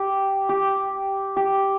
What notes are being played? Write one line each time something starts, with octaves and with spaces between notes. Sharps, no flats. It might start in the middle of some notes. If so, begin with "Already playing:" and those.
Already playing: G4
G4
G4